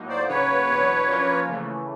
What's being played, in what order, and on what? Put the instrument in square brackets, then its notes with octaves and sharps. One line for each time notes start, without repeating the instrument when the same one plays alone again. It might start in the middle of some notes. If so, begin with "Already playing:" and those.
Already playing: [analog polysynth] A2 F#3 A#3 D#4
[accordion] C5 D5
[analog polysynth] C#3 F#3 A#3 C#4 F#4 [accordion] B4 C#5
[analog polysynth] E2 B2 F#3 B3 D4
F3 A#3 C#4 F4 A#4
C#3 E3 A3